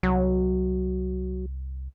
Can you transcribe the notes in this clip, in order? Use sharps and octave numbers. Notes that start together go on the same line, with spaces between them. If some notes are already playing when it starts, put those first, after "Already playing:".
C2 F#3